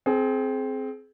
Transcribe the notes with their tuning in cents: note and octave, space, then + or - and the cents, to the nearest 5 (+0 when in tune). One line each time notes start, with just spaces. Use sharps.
C4 +0 G#4 +30